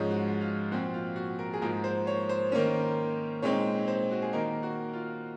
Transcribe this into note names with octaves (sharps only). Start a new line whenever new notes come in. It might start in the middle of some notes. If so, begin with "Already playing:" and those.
Already playing: G#2 F3 G#3 C#4
F#4
F4
A#2 F3 C4 F#4
F4
F#4
A#4
G#4
G#2 F3 A#3 A#4
C5
C#5
C5
D#3 A#3 C#4
A#2 G#3 C4 D#4 C#5
C5
F#4
G#4
D#3 A#3 D#4 A#4
F#4
F4